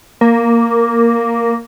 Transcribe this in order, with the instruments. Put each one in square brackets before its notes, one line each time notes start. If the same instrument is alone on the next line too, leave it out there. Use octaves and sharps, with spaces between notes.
[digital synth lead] A#3